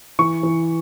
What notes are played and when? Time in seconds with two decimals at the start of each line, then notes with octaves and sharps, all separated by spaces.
0.19 E3 C#6
0.43 E3